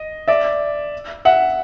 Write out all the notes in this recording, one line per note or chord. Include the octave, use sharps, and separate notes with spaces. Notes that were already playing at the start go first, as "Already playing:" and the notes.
Already playing: D#5
D5 E5
E5 F#5